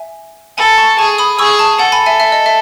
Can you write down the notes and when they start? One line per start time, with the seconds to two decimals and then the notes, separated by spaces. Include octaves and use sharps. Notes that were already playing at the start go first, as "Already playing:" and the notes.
Already playing: E5 G#5
0.58 A4 G#5 B5
0.78 A5 C#6
0.99 G#4 A5 C#6
1.18 B5 D#6
1.39 G#4 C#6 E6
1.59 A5 C#6
1.79 A4 F#5 A5
1.92 G#5 B5
2.06 E5 G#5
2.20 E5
2.32 D#5
2.46 E5